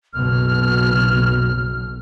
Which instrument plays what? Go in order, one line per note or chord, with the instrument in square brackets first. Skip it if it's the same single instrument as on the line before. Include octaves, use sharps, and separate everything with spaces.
[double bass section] F#1 B1 B2 [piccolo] F6